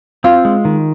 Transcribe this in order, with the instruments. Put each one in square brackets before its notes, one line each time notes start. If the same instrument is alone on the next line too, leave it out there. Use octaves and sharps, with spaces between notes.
[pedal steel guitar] C4 [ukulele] F4
[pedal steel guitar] G#3
D#3